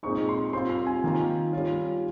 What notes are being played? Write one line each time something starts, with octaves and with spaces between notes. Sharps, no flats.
A#2 G#3 C4 D#4 C#6
C6
G3 C4 F4 C6
C6
G#5
D#3 A#3 F4
G3 C#4 F4